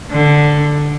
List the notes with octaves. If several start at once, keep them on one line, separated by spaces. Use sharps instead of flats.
D3